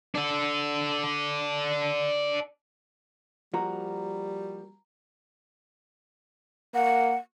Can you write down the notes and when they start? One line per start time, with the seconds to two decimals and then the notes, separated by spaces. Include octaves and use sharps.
0.15 D4 A4
3.54 F3 G3 A#3 F#4 A#5
6.75 A#3 F#5